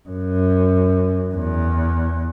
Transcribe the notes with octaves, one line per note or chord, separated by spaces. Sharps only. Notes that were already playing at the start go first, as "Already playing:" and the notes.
F#2
E2